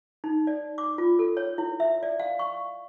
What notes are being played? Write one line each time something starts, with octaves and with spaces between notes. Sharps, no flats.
D#4
D5
D6
F4
A4
C#5
E4
E5
D5
F5
C#6